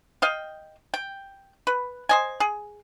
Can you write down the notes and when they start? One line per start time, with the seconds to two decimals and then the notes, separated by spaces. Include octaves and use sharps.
0.22 D#5 F5 G5
0.94 G5
1.67 B4
2.09 C5 D#5 G#5
2.40 G#4